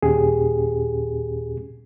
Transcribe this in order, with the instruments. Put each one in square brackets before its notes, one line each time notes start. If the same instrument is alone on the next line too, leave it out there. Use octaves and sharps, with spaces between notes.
[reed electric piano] D#2 A#2 C#4 G4 G#4